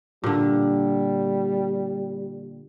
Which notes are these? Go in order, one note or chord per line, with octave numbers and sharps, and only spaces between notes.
A#2 D3 G3